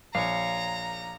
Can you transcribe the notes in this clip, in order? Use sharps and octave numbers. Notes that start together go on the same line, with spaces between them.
A#1 C#5 F5 A#5